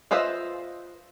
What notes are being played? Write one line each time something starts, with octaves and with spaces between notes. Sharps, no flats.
F4 B4 C5 D#5 E5